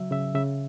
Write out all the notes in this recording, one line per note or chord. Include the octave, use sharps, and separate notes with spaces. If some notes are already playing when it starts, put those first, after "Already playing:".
Already playing: C#3 F#3 E5
C#3 E5
C#3 E5